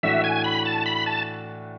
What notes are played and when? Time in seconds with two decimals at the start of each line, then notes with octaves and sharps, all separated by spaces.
0.03 A2 E3 A3 D4 F#4 E5
0.24 G#5
0.44 B5
0.65 A5
0.86 B5
1.06 A5